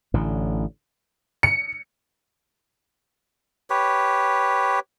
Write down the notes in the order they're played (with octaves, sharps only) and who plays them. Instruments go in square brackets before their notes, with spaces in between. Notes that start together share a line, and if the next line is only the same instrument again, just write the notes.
[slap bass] A1 A2 D3
[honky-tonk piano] C#7
[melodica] G4 B4 C#5